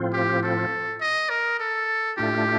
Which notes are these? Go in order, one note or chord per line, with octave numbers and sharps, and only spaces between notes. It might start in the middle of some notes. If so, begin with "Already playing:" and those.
Already playing: A2 F3 C4 F4
G4
A4
D#5
A#4
A4
A2 A3 D4 F4 G4